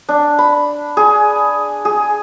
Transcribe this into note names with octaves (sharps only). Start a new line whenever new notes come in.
D4
B5
G#4
G#4